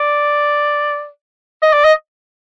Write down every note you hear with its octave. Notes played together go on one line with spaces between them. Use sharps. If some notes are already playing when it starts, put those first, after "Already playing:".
Already playing: D5
D#5
D5
D#5